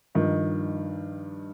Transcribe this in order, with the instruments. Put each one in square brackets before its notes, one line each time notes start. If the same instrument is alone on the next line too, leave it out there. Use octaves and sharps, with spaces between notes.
[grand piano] G2 F3 D#4 [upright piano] D#3